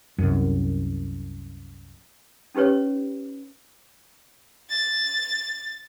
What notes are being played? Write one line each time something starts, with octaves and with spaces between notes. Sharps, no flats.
C2 F#2
C#4 D#4 G4 B4 C#5
A6